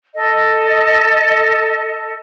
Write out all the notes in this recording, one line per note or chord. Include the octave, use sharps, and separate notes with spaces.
A4 D#5